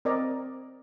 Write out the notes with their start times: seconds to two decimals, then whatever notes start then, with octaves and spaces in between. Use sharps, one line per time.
0.05 C4 A#4 D5 D#5 A#5